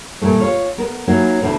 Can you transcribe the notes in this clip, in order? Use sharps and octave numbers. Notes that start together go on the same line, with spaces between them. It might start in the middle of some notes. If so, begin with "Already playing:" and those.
A#2 E3 G3 A3
F4 C#5
B3 A#4
F#3 A#3 C#4 D#4 E4 F#4
D2 B2 E3 A3 D4 E4